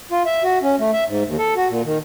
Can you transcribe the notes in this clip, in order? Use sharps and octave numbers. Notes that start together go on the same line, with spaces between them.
F4
E5
F#4
C#4
A3
E5
G#2
D#2
A4
F#4
A#2
D#3